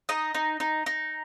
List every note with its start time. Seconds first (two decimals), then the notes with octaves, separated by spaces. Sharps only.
0.09 D#4 D#5
0.35 D#4
0.60 D#4
0.86 D#4